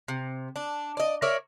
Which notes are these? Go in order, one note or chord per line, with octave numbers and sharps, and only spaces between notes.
C3
D4
D5 D#5
A#4 C#5 D5 E5